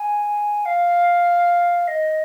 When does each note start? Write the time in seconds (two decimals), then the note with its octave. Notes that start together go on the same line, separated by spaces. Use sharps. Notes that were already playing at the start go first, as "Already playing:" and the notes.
Already playing: G#5
0.65 F5
1.88 D#5